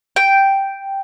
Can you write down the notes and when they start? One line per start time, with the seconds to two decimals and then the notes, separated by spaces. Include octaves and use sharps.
0.16 G5